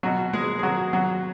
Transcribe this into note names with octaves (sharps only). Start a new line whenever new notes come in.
B2 F#3 F#4
G#3 G#4
G#4
F#3 F#4
F#3 F#4